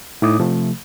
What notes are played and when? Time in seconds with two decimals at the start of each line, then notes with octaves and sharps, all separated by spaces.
0.22 A2 D#4 E4 D6 D#6
0.40 C3 F3 A3